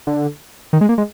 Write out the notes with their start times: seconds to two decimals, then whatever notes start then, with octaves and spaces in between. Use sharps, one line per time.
0.07 D3
0.73 D#3
0.81 G#3
0.89 A#3
0.98 G#3